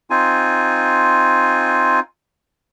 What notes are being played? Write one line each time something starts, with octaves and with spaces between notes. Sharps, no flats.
C4 D#4 F4 G#5